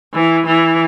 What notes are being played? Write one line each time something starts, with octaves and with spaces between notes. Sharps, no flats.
E3
E3